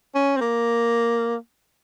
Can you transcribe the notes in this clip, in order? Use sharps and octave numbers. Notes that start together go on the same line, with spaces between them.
C#4
C4
A#3